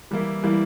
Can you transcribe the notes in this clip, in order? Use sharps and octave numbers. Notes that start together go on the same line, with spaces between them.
E3 G3 A#3 E4
E3 G3 A#3 E4